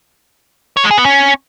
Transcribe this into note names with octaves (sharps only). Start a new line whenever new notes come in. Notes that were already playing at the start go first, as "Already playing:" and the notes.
C#5
G#3
G#4
B3
C#4